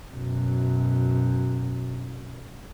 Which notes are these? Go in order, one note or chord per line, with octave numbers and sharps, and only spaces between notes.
F#2 B2